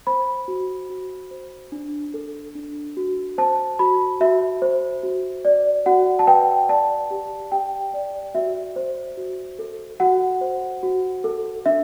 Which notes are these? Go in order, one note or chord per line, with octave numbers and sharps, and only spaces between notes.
C5 B5
F#4
F#4
C5
D4
A4
D4
F#4
C5 A5
F#4 B5
F#4 E5
C5
F#4
D5
F#4 F#5
A5
B4 G5
D5 A5
G4
G4 G5
D5
F#4 E5
C5
F#4
A4
F#4 F#5
C5
F#4
A4
D4 E5